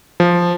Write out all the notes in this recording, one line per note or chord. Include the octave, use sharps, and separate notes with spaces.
F3